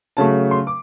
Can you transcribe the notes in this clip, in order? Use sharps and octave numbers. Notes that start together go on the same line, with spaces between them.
C#3 F#3 A3 A5
C6
D6